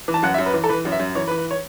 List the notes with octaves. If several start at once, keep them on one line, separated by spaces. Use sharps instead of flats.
E3
A5
F#2 F#5
E5
F#2
B4
E3
A4
E3 B4
F#2
E5
F#2
E3 C#5
B4
E3
B4
C#5